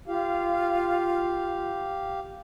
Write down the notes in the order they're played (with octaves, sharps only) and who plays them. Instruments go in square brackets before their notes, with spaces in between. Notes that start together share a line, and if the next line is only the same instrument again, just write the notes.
[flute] F4 [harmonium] G4 F5